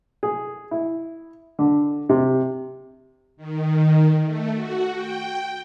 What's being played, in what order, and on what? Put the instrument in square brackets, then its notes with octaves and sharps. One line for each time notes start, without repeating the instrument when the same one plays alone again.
[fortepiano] G#4
E4
D3
C3
[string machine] D#3
A3
F#4
G5